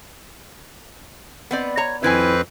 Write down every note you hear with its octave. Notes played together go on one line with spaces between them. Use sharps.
B3 C4 D5
C#5 A#5
F2 D#3 C4 E4 B4 G#5